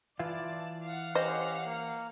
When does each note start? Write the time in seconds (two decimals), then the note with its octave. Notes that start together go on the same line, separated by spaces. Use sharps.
0.19 E3 E4 F4 D5 A5
0.83 F5 F#5
1.15 C#4 G4 C5 D#5
1.66 A#3